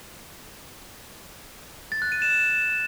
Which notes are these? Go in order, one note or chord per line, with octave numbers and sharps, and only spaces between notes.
A6
F#6
D#7
E7